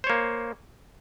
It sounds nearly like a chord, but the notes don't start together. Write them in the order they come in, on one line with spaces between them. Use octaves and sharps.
C5 C#5 A#3